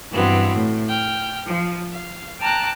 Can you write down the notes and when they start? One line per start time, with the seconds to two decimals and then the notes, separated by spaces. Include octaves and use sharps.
0.13 G2 E3 F#3 B3 C4
0.53 A2
0.88 G5 F6
1.46 F3
1.92 F5
2.41 G5 A5 A#5 D6 F6 F#6